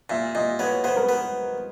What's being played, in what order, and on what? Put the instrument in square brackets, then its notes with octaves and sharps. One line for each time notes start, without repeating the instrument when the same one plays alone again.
[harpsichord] A#2 [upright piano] E5
[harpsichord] A#2 [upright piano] D#5
[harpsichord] B3 [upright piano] C#5
[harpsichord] B3 [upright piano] C5
[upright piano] A#4
B4
[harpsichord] B3